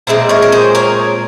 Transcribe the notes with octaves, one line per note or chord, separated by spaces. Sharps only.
A#2 G#3 C4 C5 E5
A#4 C#5
A#4
G#4 C5
A#4 C#5